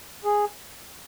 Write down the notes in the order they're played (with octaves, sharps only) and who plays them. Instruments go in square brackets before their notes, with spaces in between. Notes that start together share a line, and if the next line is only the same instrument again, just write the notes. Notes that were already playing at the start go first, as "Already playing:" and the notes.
[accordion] G#4